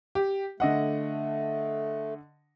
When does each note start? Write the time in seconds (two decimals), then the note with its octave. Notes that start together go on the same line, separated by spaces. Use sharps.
0.15 G4
0.60 D3 A3 D#5 F#5